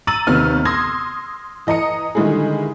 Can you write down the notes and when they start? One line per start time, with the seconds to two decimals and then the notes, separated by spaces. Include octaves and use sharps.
0.07 A#5 E6 A6 D#7 F#7
0.27 D#2 C3 D#3 B3 F6
0.65 C6 D#6 E6 G#6 A#6
1.67 E3 D#5 A#5 D#6 C#7
2.15 D3 D#3 G3 G#3 E4 G#4